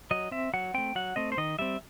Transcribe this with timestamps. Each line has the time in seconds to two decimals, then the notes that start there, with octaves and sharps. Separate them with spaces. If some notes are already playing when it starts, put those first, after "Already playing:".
0.11 F#3 D#5
0.31 C4 E5
0.54 F#3 F#5
0.74 A3 C4 G5
0.95 F#3 F#5
1.16 A3 C4 D#5
1.32 C5
1.37 D#3 D#5
1.59 G3 C4 E5